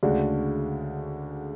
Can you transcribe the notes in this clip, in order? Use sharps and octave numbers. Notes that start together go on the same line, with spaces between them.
D2 C#3 G#3 D4 F#4